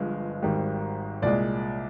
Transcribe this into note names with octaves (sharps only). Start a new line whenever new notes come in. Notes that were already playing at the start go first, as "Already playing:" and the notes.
Already playing: G1 G2 F3 G#3
G#1 G#2 D#3 G3
C2 A#2 G#3 D5